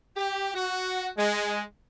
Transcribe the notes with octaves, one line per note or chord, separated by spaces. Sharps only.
G4
F#4
G#3